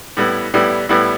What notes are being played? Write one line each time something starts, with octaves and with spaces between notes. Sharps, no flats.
A2 G3 B3 E4
A2 G3 B3 E4
A2 G3 B3 E4